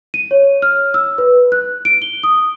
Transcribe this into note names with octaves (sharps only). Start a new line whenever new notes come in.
D#7
C#5
F6
E6
B4
F#6
D7
G7
D#6